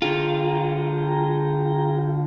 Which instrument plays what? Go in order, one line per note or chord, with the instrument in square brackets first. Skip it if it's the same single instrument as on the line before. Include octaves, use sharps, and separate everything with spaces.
[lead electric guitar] D3 F4 [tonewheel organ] G#4 G5 A#5